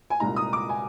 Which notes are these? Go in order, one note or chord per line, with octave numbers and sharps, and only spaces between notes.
G#5
C2 A#2 G#3 D#4 A#5
D#6
D6
G#5